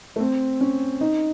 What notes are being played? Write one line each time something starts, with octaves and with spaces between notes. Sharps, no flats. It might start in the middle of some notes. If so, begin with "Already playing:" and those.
A3
C4
C#4
D#4